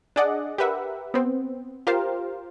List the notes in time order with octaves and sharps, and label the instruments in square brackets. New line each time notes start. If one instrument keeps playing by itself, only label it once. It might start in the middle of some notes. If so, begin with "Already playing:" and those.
[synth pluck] D4 G#4 D5 D#5 F#5
G4 A#4 B4 E5 F#5
B3 C4
F4 G4 A#4 C5 F5